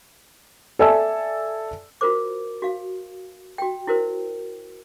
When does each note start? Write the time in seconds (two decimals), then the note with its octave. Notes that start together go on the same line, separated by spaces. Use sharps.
0.79 A4 D5 E5 G#5 A5 E6
2.01 F4 F#4 A#4 C5 D6
2.62 F#4 F5
3.58 F#4 G5
3.87 E4 F#4 A#4 C5